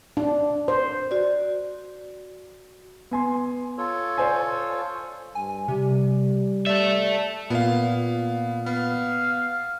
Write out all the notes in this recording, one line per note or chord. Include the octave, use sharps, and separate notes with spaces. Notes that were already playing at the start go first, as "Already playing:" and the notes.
D4
C5
F#4 D5
B3 G#5 C6
F4 A4 C#5
C5 D5 G#5
G2 G#5
C3 G3
A4 D5 E5
A#2 B3 F5
B3 F5